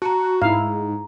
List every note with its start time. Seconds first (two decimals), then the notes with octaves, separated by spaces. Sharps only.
0.02 F#4 A5 A#5
0.42 G#2 E4 F5 A#5